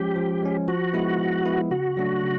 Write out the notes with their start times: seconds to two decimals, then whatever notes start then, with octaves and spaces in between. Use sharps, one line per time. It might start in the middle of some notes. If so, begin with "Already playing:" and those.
Already playing: F3 G#3 C#4 G4
0.16 F3
0.42 G#3 C#4
0.67 F3 F#4
0.93 G#3 B3 E4
1.19 F3
1.45 G#3 B3 E4
1.71 C#3 F#4
1.97 F#3 A3 D4
2.23 C#3